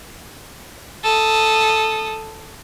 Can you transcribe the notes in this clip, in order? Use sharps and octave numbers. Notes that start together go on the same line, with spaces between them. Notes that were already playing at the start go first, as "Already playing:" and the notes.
A4 D#6